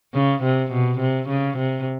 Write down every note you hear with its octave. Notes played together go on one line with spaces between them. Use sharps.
C#3
C3
B2
C3
C#3
C3